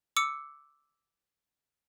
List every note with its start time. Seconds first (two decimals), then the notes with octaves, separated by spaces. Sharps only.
0.17 D6 E6 C#7